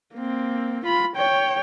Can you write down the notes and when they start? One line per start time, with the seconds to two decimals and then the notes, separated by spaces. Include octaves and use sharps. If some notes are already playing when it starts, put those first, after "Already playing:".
0.15 A#3 C4
0.85 F4 B5
1.16 C#5 G5